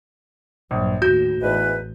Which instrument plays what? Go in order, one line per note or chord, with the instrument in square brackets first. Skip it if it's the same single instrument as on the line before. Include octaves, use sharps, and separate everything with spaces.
[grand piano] A#1 [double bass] G2 F#3
[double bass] D#2 A2 [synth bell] F#4 [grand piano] G6
[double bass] A1 [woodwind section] E2 G#2 B4